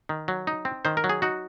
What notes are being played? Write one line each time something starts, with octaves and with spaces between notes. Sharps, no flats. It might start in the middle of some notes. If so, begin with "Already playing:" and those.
D#3
F#3
D#4
C4
D#3 C5
A#4
F#3
G#4
D#4 F#4